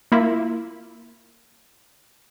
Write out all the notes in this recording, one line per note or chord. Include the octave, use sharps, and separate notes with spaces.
A#3 E4 F4